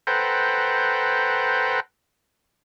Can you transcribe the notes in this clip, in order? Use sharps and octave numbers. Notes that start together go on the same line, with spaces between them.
A4 B4 C5 F#5 G5 A#5